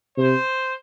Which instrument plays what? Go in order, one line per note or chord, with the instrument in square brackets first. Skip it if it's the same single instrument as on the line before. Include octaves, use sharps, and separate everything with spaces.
[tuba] C3 [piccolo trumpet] C5